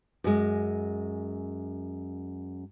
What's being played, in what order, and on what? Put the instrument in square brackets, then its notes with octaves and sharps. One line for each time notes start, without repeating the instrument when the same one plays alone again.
[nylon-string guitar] F#2 G#3